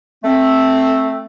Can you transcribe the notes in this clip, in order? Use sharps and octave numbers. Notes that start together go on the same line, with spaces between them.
A3 C4